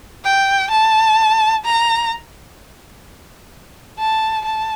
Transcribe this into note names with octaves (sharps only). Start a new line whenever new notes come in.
G5
A5
A#5
A5
A5